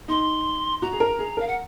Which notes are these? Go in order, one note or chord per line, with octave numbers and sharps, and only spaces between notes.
D#4 C6
F#4 A#5
G#4
A#4
G#4
A#4 F5
F#5